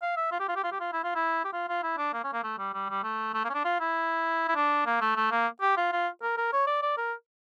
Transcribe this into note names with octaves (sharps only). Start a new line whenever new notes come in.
F5
E5
F4
G4
F4
G4
F4
G4
F4
E4
F4
E4
G4
F4
F4
E4
D4
A#3
C#4
A#3
A3
G3
G3
G3
A3
A3
A#3
C#4
D4
F4
E4
E4
D4
A#3
A3
A3
A#3
G4
F4
F4
A#4
A#4
C#5
D5
D5
A#4